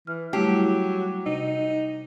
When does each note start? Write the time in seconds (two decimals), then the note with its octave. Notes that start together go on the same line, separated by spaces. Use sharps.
0.07 E3 F6
0.33 F#3 G3 A3 E4 G4
1.26 C3 D#4